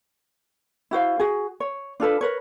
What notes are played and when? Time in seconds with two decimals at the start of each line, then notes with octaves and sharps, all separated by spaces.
0.91 E4 F#4 C5 F5
1.20 F#4 G#4
1.60 C#5
2.00 D4 F4 A4 B4
2.21 A#4 B4 C#5